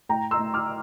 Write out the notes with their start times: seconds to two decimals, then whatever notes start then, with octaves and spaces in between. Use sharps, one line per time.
0.09 A2 G5 A#5
0.31 C6 E6
0.39 A2
0.54 D6 F6